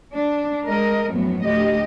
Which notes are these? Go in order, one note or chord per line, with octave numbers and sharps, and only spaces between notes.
D4
G#3 A#4 D#5
F#2 A2 F3 F#3 B3
D2 G4 D#5